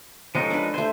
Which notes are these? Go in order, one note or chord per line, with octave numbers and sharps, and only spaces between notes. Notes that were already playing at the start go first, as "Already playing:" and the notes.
F3 G#3 C#4 D#4 A4
D4 B4
A3 C5 G#5